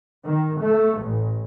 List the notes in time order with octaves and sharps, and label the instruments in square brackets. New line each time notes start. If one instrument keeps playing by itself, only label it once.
[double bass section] D#3
A3
A1